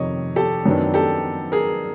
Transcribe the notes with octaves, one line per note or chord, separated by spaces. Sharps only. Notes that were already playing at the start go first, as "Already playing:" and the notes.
Already playing: F2 C3 D#3 C#5 D#5
G4 A4
F#2 D#3 F#3 B3 D4
G4 A4
G#4 A#4